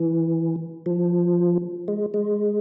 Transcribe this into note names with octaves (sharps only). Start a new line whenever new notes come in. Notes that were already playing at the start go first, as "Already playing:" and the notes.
Already playing: E3
F3
G#3
G#3